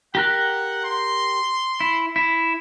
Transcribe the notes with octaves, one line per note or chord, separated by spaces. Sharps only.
G4 A#4 F#5 F#6
C6
E4
E4